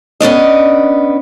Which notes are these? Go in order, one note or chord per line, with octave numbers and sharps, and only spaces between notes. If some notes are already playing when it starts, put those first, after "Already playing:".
B3 C#4 D4 D#5